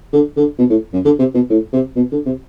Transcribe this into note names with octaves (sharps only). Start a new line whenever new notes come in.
D3
D3
B2
A2
F#2
D3
C3
B2
A2
C3
B2
D3
C3